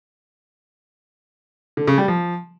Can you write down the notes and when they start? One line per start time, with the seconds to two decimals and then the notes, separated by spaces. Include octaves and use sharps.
1.77 D3
1.87 C#3
1.98 G3
2.08 F3